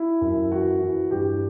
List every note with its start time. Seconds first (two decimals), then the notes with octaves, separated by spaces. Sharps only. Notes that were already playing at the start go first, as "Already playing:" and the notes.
Already playing: E4
0.21 F#2
0.51 E3 F#4
0.81 E3
1.11 G2 G4